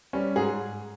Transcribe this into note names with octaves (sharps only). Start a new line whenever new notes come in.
G3 C#4
G#2 G#4